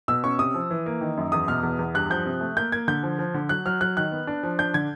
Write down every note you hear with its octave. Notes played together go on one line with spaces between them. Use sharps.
B2 E6
C#4 C#6
C3 D#6
F3
E3
A#3
D#3
F#2
E2 D#6
B2 F6
E2
E2
G2 F#6
F3 G6
C3
A3
A#3 G6
A#3 G#6
D3 G6
F3
F3
D3
F#3 F#6
F#3 F6
F#3 F#6
D#3 F#6
B3
D4
F3
D4 G6
D3 G#6